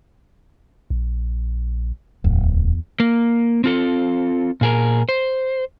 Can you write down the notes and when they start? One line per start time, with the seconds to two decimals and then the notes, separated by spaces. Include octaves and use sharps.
0.90 A#1
2.24 D1 E2
3.00 A#3
3.64 C4 F4 A4
4.61 A#2 G#4 A#4
5.09 C5